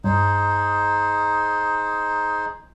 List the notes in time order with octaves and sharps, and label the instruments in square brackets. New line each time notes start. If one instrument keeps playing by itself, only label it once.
[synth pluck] G2 [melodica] D#4 G#4 C5